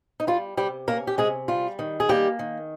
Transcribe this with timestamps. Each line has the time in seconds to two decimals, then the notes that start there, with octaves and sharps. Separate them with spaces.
0.20 D#4
0.27 G3 F4
0.57 C3 G3 G4
0.88 A#3 C#4 A#4
1.07 G4
1.18 C3 G#3 G#4
1.48 G3 F4
1.79 D#3
2.00 G#4
2.09 G3 A#3 G4
2.39 D#3